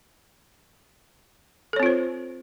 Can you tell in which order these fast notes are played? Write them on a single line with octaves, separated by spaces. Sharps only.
A4 C#5 C4 F4 C5